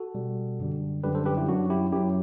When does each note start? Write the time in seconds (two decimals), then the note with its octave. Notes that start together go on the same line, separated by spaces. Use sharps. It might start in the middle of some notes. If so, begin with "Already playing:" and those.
Already playing: F#4 A4
0.15 B2 G3
0.59 F#2 D3 G3
1.03 F#2 D3 G3 G4 B4
1.15 A4 C5
1.25 G4 B4
1.37 E4 G4
1.48 F#2 F#3 D4 F#4
1.70 E4 G4
1.92 F#2 F#3 E4 G4